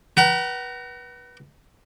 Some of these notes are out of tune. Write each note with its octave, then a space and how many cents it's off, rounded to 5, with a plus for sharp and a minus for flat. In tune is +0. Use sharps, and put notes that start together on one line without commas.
B4 -25 F#5 +40 A#5 -10